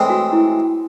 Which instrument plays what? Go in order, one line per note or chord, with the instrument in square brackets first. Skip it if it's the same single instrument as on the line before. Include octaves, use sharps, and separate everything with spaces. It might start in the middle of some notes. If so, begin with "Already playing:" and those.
Already playing: [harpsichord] A2 E3 G#3 C4
[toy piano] F#4
E4